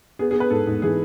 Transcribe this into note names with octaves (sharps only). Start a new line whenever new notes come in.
B3 G#4
G#4
B3
B4
G#2 A4
G#2
E3 G#4